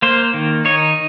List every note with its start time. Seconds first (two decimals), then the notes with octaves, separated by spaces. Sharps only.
0.02 A#3 C5
0.34 D#3
0.65 D#4 C#5